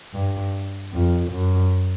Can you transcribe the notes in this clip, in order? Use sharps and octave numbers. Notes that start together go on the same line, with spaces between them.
G2
F2
F#2